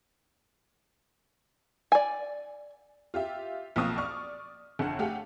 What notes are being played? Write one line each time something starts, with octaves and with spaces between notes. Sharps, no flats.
D5 G#5
F4 G4 E5
B1 F3 A#3 C4 C#6 D#6
D5 C#6 F6
G1 F2 D3 F#5
A3 G4 G#4 F5 F#5